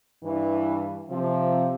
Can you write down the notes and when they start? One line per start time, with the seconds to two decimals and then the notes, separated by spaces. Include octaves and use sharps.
0.23 G2 E3
1.10 C3 F3